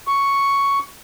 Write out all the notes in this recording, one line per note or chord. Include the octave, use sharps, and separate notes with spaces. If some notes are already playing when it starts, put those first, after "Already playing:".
C#6